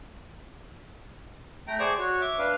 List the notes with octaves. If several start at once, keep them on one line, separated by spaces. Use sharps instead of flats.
A3 G5 A#5
G#4 C5 D5 C#6
F#4 C#5
E5 D6
D4 B4 F5